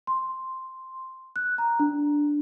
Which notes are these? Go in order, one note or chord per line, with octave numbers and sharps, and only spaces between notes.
C6
F#6
A#5
D4